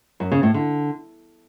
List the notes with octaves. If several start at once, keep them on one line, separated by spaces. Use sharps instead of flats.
F#2
C#3
A2
D3